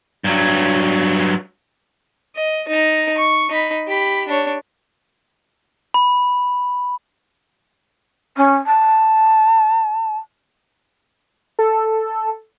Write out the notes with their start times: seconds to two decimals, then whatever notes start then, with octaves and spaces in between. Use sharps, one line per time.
0.24 G2 F#3
2.35 D#5
2.68 D#4 A#5
3.17 C#6
3.49 D#4 B5
3.88 G4 B5
4.28 D4 C#5
5.94 B5
8.37 C#4
8.66 A5
11.59 A4